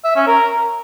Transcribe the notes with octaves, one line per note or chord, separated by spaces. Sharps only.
E5
C#4
A#4